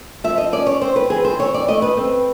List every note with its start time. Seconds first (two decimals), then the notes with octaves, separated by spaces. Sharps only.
0.24 F3 E5
0.38 D#5
0.52 C#4 D5
0.67 C#5
0.81 C4 C5
0.96 B4
1.10 E3 G#4
1.25 C5
1.39 C4 C#5
1.54 D5
1.68 A3 D#5
1.82 B4
1.97 C4